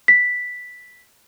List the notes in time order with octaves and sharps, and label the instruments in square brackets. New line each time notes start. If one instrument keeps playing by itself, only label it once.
[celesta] B6